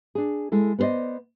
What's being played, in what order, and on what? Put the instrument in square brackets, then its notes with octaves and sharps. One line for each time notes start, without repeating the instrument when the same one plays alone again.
[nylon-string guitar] D4 G#4
G#3 E4 A4
B3 G#4 C5 D5 D#5